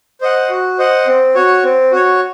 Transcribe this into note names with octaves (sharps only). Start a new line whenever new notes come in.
C5 D#5 F#5
F#4
C5 D#5 F#5
C4
F#4 C#5
C4
F#4 C#5